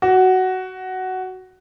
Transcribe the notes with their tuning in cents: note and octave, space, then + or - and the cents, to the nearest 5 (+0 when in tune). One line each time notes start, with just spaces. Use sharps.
F#4 +10